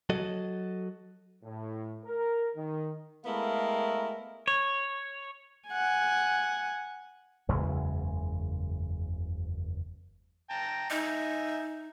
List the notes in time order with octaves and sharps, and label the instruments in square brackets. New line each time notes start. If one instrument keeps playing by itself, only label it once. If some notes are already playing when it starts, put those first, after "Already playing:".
[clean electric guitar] F#3 F#4 A4 D#5
[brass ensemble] A2
A#4
D#3
[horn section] G#3 A3 B3 E4 A#4 F5
[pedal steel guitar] C#5
[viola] F#5 G#5
[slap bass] F#1 E2 C#3 G#3
[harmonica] G5 A5 A#5
[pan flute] D#4 [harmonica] D#5 E5 G#5